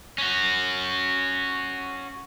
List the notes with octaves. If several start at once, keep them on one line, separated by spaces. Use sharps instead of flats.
C#4 F#4